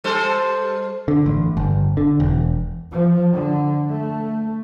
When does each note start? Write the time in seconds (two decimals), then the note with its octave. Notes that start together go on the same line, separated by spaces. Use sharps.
0.04 G3 A4 C5
1.08 D3
1.26 A1
1.57 G1
1.97 D3
2.20 E1
2.92 F3
3.35 D3
3.90 A3